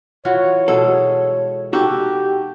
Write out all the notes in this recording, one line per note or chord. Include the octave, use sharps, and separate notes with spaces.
E3 F4 F#4 C#5
B2 G#3 G#4 A4
D#4 F#4 G4 A4